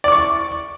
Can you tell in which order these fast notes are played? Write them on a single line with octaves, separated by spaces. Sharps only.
D5 D6 C#6